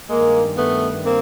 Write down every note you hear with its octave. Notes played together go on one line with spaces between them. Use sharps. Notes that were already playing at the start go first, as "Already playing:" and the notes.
G2 D#3 G#3 A#3
A3 B3
A#3 C4